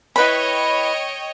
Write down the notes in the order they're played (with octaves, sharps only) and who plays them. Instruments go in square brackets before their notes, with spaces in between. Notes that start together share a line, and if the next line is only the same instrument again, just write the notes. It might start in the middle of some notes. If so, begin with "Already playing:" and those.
[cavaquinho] E4 B4 B5 [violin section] C#5 D#5 G5